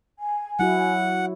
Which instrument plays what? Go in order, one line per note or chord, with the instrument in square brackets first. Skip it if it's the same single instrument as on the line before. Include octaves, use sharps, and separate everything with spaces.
[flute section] G#5
[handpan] F#3 E4 F#4 [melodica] F#5